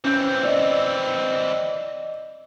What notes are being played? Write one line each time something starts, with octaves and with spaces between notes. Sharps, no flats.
E3 C4 C#4 G6
D5 D#5